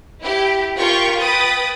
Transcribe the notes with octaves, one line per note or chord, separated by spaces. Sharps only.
E4 G4
F4 G4 A#4 G5 C#6 G6
B4 G5 B5 D#6 A6